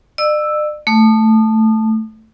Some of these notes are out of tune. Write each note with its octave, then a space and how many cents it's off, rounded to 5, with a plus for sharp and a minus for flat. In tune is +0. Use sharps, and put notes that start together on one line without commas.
D5 +45 E6 +0
A3 +0 D#6 -35